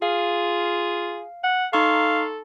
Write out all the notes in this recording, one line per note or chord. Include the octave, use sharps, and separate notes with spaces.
F4 G#4 F5
F#5
D#4 A4 F5 C6 C#6